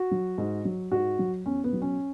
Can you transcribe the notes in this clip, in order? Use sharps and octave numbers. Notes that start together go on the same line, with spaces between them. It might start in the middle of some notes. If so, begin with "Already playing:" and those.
Already playing: F#4
F#3
G#2
F#3
G#2 F#4
F#3
E2 C#4
B3
B2 F#3
C#4